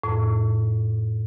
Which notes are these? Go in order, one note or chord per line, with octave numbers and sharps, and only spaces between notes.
F2 A2